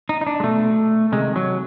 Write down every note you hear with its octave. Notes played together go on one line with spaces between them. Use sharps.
D#4
D#4
D4
G#3
B2 A3
C3 D#3 G#3
F#3